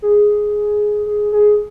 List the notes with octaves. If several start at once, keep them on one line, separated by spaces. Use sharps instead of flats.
G#4
G#4
G#4